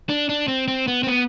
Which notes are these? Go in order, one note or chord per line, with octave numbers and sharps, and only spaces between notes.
D4
D4
C4
C4
B3
C4
B3